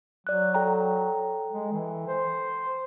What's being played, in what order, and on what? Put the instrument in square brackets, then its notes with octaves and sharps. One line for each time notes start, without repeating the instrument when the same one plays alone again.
[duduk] F#3 [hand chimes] D5 F#6
[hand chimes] A4 G5 A#5
[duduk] G#3
E3
C5